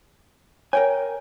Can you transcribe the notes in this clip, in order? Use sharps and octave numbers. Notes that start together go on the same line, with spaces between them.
A#4 C#5 G5 G#5